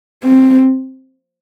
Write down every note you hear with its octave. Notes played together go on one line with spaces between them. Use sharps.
C4